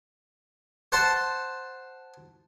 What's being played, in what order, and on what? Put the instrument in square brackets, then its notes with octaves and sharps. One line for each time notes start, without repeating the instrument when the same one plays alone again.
[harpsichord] C5 F#5 A5 C6